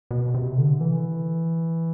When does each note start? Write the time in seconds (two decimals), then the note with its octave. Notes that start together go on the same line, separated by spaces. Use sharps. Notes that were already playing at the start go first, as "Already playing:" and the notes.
0.11 B2
0.34 C3
0.58 D3
0.81 E3